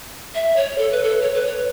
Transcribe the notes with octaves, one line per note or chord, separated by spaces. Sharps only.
E5
C#5
A4
B4
A4
C#5
B4
C#5